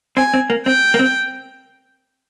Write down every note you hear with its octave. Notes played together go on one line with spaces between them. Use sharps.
C4 G#5
C4
A#3
C4 G5
A#3
C4